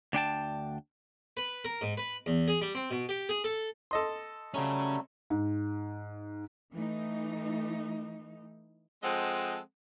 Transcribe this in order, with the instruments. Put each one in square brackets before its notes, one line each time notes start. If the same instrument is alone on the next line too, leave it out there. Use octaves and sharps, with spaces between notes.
[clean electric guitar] D2 D4 G5 A5
[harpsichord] B4
A#4
G#2
B4
E2
G#4
G3
C4
B2
G4
G#4
A4
[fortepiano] A4 D#5 C6
[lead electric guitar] C#3 C#4 [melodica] F#3 G3 A3
[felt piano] G#2
[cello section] E3 A3 D#4
[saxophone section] F3 G#3 C4 A4 D#5 F#5